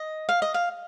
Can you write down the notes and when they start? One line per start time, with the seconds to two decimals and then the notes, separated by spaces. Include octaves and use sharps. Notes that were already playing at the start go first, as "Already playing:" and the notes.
Already playing: D#5
0.29 F5
0.42 D#5
0.54 F5